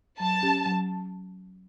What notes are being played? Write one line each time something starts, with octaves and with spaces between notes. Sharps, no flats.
F#3 A5
C#4 G4
F#3